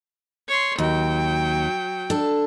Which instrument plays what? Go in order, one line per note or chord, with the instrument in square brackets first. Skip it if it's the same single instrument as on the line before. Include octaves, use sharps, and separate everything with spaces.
[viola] C#5 C6
[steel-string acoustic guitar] D#2 [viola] F#3 G5
[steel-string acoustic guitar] D4 A4